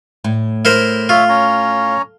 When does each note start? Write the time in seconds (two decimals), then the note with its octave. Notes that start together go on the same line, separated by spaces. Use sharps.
0.24 A2
0.65 E4 A#4 C5
1.09 F4 C#5 E5
1.29 C#4 C#5 A#5